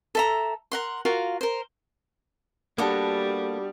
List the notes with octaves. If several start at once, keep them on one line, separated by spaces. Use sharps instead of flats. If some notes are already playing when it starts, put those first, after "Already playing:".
A4 E5 A#5
A#4 F#5 C6
F4 F#4 A#4 F5
A#4 C5
G3 A#3 B3 D4 F#4 A4